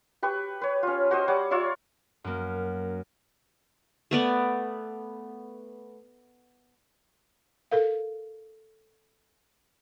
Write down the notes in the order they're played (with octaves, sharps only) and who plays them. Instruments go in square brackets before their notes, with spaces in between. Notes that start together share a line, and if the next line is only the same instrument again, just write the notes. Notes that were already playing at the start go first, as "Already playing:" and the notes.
[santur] G4 B4 G5 C#6
B4 C#5
C#4 F4
F#4 C5 D#5
G3 C#5 F#5 D6
F4 C#5 D5 E5
[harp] F#2 A#3
[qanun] A3 B3 D5
[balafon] A4 A#4 F5